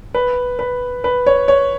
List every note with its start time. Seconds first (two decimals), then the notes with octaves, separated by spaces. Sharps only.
0.14 B4
0.59 B4
1.04 B4
1.26 C#5
1.48 C#5